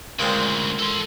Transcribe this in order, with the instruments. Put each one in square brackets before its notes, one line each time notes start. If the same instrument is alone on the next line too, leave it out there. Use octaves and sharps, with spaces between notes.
[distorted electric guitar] D2 C#3 [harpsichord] A#2 G#3 C4
[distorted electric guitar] A4 C6